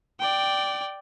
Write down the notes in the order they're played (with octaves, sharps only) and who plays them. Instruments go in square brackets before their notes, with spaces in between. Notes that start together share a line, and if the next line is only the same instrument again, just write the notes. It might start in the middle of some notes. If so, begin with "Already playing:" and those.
[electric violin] D5 G5